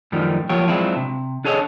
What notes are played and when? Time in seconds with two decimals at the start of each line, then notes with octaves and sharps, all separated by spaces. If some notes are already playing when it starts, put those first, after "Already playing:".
0.12 F#2 A2 D#3 F3 G3
0.49 F3 F#3 A#3 F4 G4 C#5
0.68 F#3 G#3 C4 D4 E4 F4
0.96 C3
1.44 D4 G#4 A4 C#5 D#5